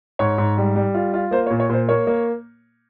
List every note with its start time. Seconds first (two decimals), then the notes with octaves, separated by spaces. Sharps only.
0.19 G#2 C#5
0.38 G#2
0.58 G3
0.76 G3
0.94 F4
1.14 F4
1.31 A#3 C5
1.47 C#5
1.50 A#2
1.60 C#5
1.69 A#2 C5
1.89 A#3 C#5
2.07 A#3